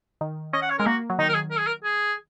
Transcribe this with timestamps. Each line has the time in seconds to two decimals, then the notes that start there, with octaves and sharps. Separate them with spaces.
0.21 D#3
0.53 C#4 D#5
0.62 F#5
0.70 C#5
0.78 G#3 A#4
0.86 A#3 F#4
1.10 F#3
1.19 D#3 D#4
1.29 A#4
1.35 G#4
1.51 A#4
1.59 G#4
1.67 A#4
1.84 G#4